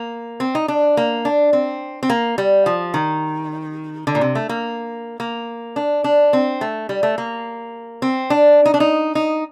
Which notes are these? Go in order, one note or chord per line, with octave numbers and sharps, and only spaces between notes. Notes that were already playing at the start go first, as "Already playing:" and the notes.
Already playing: A#3
C4
D#4
D4
A#3
D4
C4
C4
A#3
G3
F3
D#3
D3
A#2
C3
A3
A#3
A#3
D4
D4
C4
A3
G3
A3
A#3
C4
D4
D#4
D4
D#4
D#4